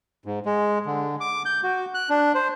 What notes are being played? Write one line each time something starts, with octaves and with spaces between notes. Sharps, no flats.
G#2
G#3
D3
D6
G6
F#4
F#6
D4
C5